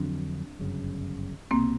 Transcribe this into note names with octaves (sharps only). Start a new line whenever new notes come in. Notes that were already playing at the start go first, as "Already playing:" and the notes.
Already playing: F2 D3 F#3 C4 D4
G1 F#2 C#3
C2 B2 G3 A#3 C4